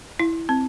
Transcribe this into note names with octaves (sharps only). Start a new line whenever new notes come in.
E4
C4